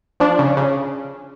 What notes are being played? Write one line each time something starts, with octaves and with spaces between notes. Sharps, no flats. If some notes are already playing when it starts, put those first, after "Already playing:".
F3 D4
C#3
C#3